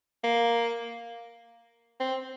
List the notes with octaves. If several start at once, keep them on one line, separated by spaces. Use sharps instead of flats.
A#3
C4